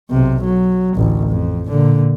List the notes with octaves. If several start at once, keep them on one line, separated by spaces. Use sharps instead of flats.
B1 C3
F#3
A1 D2
F2
A#2 D3